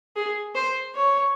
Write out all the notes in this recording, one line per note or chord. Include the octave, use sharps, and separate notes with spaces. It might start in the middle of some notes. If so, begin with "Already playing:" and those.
G#4
C5
C#5